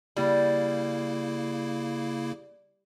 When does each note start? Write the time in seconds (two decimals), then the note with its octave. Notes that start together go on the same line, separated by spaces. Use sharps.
0.17 C#3 G3 A#3 E4